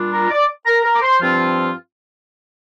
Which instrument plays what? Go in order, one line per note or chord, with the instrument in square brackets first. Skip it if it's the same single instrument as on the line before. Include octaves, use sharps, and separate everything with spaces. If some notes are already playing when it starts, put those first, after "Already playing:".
Already playing: [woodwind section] A#2 G3 D4 F4
A#4 A#5
D5 D6
A#4 A#5
A#4 A#5
D6
C5 C6
G2 F3 C4 F4